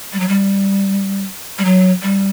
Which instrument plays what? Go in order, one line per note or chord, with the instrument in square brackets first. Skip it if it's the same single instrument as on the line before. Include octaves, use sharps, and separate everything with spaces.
[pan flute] G3
F#3
G3
G3
F#3
G3